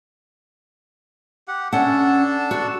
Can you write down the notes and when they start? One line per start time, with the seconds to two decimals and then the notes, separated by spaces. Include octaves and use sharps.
1.48 G4 F#5
1.73 C#4 D4 A4 F#5 A5
2.51 F#4